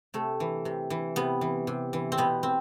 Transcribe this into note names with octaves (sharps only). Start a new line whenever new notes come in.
C3 A3
E3
C3
E3
C3 B3
E3
C3
E3
C4
B2 B3
C4